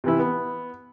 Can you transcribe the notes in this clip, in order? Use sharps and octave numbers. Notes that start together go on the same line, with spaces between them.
C3 E3 E4
B3